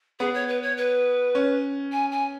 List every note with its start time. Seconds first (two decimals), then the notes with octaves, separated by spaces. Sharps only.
0.20 B3 G#4
0.34 C#5
0.48 B4
0.63 C#5
0.77 B4
1.35 C#4
1.92 G#5
2.12 G#5